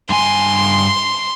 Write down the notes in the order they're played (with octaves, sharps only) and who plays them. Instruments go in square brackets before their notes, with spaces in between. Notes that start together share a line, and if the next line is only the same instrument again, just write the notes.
[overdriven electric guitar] G2 G#5 [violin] C6